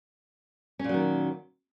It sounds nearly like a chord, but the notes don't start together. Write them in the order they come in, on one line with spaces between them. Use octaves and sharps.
C#4 A#2 F#3 D#3